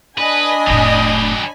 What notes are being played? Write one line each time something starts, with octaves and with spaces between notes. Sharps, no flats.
D4 B4 D#5 G#5 B5
F1 A2 F#3 G4